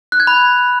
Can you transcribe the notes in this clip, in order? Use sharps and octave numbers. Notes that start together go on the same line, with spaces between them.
F#6
G#6
B5